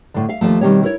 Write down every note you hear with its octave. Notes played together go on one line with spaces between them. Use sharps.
A2 D3
E5 F5
D#2 C3 F3 A3
B2 D#3 F#3 G3 C4 C#5
E4 A#4 C#5